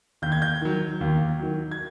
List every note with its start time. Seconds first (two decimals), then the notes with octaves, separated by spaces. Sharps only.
0.22 D#2 G6
0.32 G#6
0.42 G6
0.62 D#3 F#3
1.01 D#2
1.39 D#3 F#3
1.71 G#6